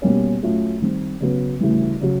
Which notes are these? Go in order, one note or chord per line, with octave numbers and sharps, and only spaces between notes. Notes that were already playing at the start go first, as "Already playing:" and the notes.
B2 G3 A#3 C#4
A2 F#3 A3 C#4 F4
D#3 G3 C4
C#3 F#3 B3
D2 C#3 E3 G3
C#3 F#3